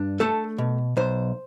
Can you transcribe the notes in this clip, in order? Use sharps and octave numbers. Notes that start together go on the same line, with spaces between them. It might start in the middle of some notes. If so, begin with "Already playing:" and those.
Already playing: G2 D4
A3 A4
B2
B1 C5